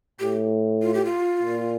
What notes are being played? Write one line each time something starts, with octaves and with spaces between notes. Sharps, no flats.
A2 G4
F4
G4
F4
A#2